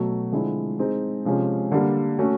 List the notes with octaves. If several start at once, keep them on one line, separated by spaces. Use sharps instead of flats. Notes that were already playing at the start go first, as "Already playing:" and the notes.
Already playing: B2 F#3 A3
D3 F3 G#3 C4 E4
G#3 C4 D#4 G#4
C3 F3 G#3 C#4
D3 G3 A#3
A3 C#4 F#4